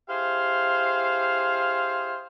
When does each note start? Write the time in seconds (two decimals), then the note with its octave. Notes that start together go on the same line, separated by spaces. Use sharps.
0.09 E4 G4 G#4 C5 F5